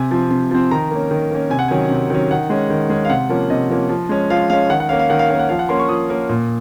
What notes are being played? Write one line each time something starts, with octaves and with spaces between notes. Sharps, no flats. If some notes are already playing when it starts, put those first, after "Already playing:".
Already playing: C3 G#5
F3 C4
C3
F3 C4
D#3 A#5
A#3 C#4
D#3
A#3 C#4
C3 G#5
F#5
D#3 F#3 C#4 G#5
C3
D#3 F#3 C#4
D#3 F#5
G#3 C#4
D#3
G#3 C#4
F5
C3 F#5
F3 A#3 C#4
C3 D#5
F3 A#3 C#4
F3
G#3 C#4
F3 F5
G#3 C#4 F5
D#3 F#5
F#5
A#3 C#4 F5
F5
D#3 F#5
F5
A#3 C#4 F5
F#5
F3 F5
F#5
A#3 C#4 C6
C#6
F3 D#6
A#3 C#4
A#2